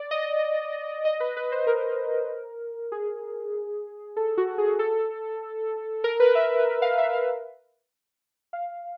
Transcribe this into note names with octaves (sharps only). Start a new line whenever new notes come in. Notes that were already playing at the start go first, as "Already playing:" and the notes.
Already playing: D5
D#5
D#5
B4
B4
C5
A#4
G#4
A4
F#4
G#4
A4
A#4
B4
E5
F5
E5
F5
F5